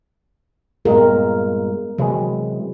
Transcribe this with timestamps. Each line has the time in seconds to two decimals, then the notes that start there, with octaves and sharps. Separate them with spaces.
0.85 G2 A#2 G#3 B3 A#4
1.98 C3 E3 F#3 G#3